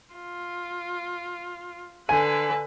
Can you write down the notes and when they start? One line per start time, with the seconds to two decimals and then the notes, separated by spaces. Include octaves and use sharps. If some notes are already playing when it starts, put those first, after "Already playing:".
0.14 F4
2.09 D3 B4 G#5 D#7